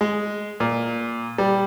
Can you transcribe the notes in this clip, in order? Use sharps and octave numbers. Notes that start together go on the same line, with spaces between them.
G#3
A#2
G3